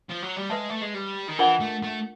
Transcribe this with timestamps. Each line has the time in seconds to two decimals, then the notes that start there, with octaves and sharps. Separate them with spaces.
0.10 F3
0.23 F#3
0.37 G3
0.50 G#3 B4 E5 A5
0.70 A3
0.82 G#3
0.94 G3
1.28 D#3
1.39 E3 D4 F4 A#4 D#5 F#5
1.60 A3
1.83 A3